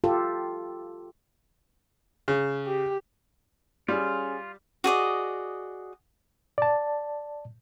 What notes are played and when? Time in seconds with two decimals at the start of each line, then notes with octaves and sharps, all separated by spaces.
0.04 F4 G4 A4
2.28 C#3
2.66 G4
3.88 G3 C#4 F4 G#4
4.84 F#4 G#4 D5 D#5
6.58 D5 A5